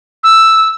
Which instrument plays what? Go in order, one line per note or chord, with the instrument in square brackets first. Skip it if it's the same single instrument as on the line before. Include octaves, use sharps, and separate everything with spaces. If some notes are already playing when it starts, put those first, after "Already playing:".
[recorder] E6